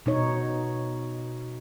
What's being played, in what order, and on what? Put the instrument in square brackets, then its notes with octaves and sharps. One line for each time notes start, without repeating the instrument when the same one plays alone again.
[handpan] B2 D#4 C#5